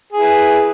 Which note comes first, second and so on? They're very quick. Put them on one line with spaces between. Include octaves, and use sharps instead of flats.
G#4 E4 B4